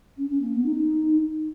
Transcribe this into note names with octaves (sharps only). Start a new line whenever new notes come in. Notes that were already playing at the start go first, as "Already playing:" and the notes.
C#4
C#4
A#3
B3
D#4